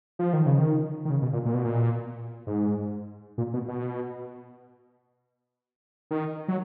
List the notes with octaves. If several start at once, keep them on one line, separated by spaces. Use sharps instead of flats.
F3
D#3
C#3
D#3
D#3
C#3
B2
A#2
A#2
B2
A#2
G#2
A#2
B2
B2
D#3
F#3